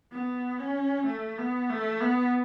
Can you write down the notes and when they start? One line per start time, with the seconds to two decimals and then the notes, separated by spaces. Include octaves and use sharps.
0.12 B3
0.59 C#4
1.06 A3
1.38 B3
1.69 A3
2.00 B3